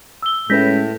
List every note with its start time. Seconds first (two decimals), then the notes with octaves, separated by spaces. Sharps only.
0.23 E6 G7
0.50 A2 G#3 C#4 B4 G6 A#6 B6